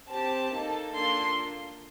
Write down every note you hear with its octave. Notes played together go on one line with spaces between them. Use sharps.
C4 G4 A5
A#3 D#4 A4
A#3 D4 F4 A4 C6